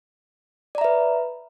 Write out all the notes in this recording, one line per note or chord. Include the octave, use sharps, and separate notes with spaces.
B4 D5 E5 A#5